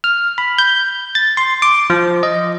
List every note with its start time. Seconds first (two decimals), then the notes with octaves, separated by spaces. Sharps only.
0.04 F6
0.38 B5
0.58 G6
1.15 A6
1.37 C6
1.62 D6
1.90 F3
2.23 D#5